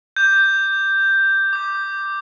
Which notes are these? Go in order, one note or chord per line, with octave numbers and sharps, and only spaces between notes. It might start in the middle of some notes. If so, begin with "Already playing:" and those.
D6 G6
D6 G6